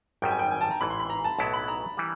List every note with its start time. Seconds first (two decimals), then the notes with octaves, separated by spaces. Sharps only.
0.22 G#1 F#2 D#3 G3 G5
0.31 G#5
0.39 G5
0.51 G#5
0.61 A5
0.71 A#5
0.81 A1 G#2 E3 B5
0.90 C6
1.00 B5
1.10 A#5
1.24 A5
1.39 B1 A2 F#3 B3 E4 A5
1.53 B5
1.68 A#5
1.97 E3 G3